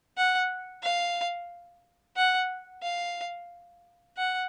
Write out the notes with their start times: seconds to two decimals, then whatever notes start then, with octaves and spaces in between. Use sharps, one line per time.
0.17 F#5
0.83 F5
2.17 F#5
2.83 F5
4.17 F#5